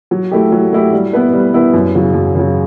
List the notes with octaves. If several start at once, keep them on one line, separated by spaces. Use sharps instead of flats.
F#3
A3 E4 G4
F#3
A3 E4 G4
G3
B3 E4 B4
G3
B3 E4 B4
F#2
C#3 F#3
F#2
C#3 F#3